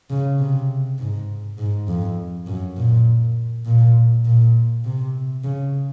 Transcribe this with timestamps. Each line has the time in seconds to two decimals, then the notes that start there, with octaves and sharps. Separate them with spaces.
0.10 C#3
0.39 C3
0.99 G#2
1.58 G#2
1.88 F2
2.47 F#2
2.77 A#2
3.66 A#2
4.25 A#2
4.85 C3
5.44 C#3